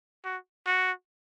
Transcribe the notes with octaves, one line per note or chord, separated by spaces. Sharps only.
F#4
F#4